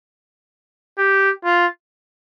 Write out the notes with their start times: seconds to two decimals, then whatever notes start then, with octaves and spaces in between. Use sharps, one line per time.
0.98 G4
1.45 F4